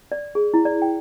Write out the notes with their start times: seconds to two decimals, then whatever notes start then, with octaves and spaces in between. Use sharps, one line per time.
0.12 D5
0.35 G#4
0.54 E4
0.65 D5
0.82 G5